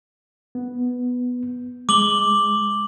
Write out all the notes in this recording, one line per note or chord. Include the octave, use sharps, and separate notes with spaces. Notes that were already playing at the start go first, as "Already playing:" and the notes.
B3
G#3 D6 F#7 G7